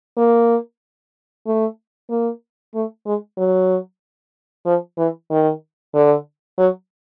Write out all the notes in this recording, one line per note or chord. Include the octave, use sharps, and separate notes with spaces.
A#3
A3
A#3
A3
G#3
F#3
F3
E3
D#3
D3
F#3